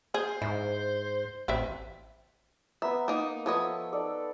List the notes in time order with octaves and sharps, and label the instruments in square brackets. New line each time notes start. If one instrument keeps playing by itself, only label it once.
[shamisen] G#4 [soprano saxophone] C5
[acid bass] G#2 [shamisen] E4
[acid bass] A1 [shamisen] C4 B4 E5
[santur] B3 A#5 [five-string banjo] E5
[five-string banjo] A#3 D#4
[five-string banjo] F3 C#5 D#5 [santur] B3 A4 E5
[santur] D#4 A4 D5